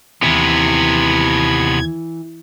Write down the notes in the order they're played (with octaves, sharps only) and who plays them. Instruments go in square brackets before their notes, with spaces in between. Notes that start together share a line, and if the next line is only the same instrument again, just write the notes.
[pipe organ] D#2 G#6 [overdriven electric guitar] C3 B3 [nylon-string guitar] E3